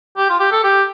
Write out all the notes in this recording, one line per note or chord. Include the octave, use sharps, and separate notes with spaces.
G4
F4
G4
A4
G4